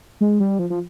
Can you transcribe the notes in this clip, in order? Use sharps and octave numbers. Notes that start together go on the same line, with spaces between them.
G#3
G3
F3
F3